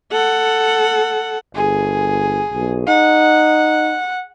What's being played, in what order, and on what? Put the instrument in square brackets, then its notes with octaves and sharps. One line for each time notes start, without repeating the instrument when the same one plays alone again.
[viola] A4 F#5
[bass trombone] G1 [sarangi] G#4
[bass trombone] B1
[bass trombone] D#4 [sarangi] F#5